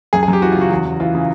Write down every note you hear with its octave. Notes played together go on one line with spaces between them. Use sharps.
F#2 G#4
G#4
F#2
G4
E3 F#4
F4
C#3 F#4
E2 F#4
E2
E3 F4
C#3